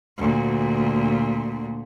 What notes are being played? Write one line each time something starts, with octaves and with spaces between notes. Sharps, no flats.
D2 A#2